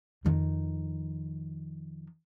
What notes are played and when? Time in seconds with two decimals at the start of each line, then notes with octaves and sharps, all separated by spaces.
0.25 F2 D#3